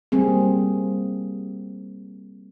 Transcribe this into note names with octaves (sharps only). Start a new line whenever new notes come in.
G3 A#3 C4 G#4